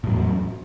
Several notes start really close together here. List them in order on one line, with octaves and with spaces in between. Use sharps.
A2 F#3 E2